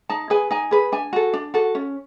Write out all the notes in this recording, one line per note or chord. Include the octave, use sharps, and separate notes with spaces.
D#4 A5
G#4 B4 G#5
D#4 G#5
G#4 B4
D4 G#5
F#4 A4
D4
F#4 A4
C#4